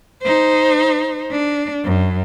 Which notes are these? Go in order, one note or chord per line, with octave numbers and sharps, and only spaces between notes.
D#4 C5
D4
F#2